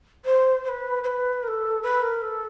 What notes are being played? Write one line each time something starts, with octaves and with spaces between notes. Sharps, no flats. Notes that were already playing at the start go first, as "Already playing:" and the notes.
C5
C5
B4
C5
B4
A#4
A4
B4
A#4
A4